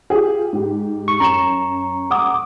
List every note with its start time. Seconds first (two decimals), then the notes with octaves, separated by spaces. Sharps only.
0.10 F4 G4 G#4
0.53 G#2 G4
1.08 C#6
1.20 F#2 A#5 C#6 E7
2.10 F#5 D6 D#6